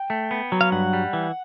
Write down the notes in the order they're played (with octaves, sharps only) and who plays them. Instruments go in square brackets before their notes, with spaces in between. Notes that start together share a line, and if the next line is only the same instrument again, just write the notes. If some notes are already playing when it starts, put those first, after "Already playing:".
Already playing: [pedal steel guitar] G5
[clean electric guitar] A3
B3
F#3
[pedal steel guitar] F5
[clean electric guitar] G2 [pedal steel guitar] F#5
[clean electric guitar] G3
E3